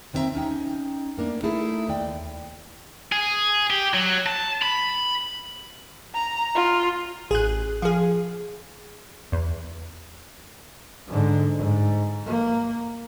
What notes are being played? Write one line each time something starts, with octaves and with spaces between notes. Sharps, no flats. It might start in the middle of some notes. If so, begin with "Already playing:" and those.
D#2 D#3 C4 G4 E5 A#5
C#4 D#4 G5
A3 A#3 D4
A3 D#4 E4 G#4 A4
D#2 D5 G5
G#4
G4
F#3
A5
B5
A#5
F4
A1 G#4 F#6
F3 G#4 F5
E2
G#2 D3
G#2
A#3